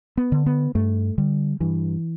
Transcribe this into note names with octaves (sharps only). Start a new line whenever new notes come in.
B3
D3
B3
G2 A3
D3 G3
G2 E3